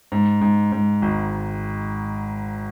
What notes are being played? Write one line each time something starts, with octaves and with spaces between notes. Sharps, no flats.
G#2
G#2
G#2
G#1